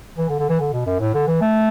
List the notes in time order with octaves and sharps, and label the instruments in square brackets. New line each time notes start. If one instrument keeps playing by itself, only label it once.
[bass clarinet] E3
D3
D3
E3
D3
B2
F#2
A2
D3
E3
A3